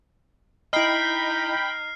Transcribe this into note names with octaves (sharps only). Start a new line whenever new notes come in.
D#4 E4 D#5 G5 B5 F6 C7